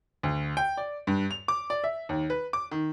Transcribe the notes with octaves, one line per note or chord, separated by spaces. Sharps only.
D2
G5
D5
G2
F7
D6
D5
E5
D#2
B4
D6
D#3